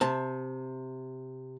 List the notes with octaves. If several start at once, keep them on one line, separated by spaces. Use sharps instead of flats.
C3 A5